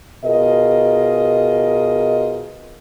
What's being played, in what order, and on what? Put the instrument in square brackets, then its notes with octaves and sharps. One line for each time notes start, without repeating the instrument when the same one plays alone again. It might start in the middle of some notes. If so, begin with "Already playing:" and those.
[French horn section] B2 F4 G#4 A#4 D#5